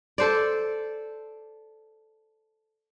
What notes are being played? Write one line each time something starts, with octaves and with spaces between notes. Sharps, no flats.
A4 C5 D5